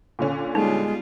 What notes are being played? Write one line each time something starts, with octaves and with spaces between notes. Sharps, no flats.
A#2 D3 C#4
G3 G#3 B3 D#4 F4